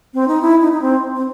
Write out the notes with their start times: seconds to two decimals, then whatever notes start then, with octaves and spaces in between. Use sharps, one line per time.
0.14 C4
0.28 D#4
0.41 E4
0.62 D#4
0.72 D#4
0.82 C4
1.15 C4